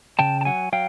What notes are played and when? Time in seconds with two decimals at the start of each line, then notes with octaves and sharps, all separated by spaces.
0.19 C#3 G5 A5
0.41 A5
0.45 F#3 F#5 G#5
0.73 F#3 F5 G5